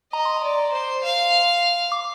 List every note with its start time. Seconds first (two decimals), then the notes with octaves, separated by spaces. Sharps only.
0.13 D#5 A#5
0.25 C6
0.37 A#5
0.43 D5
0.72 C5
1.03 F5
1.92 D6